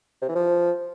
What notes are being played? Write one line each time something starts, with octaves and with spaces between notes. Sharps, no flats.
C3
E3
F3